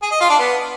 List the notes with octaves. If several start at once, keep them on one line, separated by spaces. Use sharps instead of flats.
G#4
D#5
F4
D4
B3